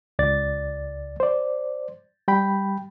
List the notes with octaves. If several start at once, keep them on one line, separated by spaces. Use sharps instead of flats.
C#2 D5 A6
C5 D5
G3 G5 B5